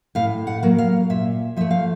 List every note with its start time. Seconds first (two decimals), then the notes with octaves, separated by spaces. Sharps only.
0.15 A2 F5
0.47 F#5
0.63 F#3 A#3
0.78 F5
1.10 A#2 E5
1.57 F3 A3 E5
1.71 F5